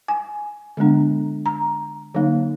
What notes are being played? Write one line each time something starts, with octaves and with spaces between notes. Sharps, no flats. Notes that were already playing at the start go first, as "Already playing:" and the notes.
G#5
D3 G#3 B3 D4
A#5
D3 F#3 A#3 D#4